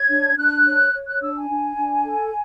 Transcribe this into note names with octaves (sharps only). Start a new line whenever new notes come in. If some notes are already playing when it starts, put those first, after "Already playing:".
Already playing: C#5 G#6
D4
D4 F#6
C#5
C#5
F#6
D4 E6
G#5
D4
D4
A4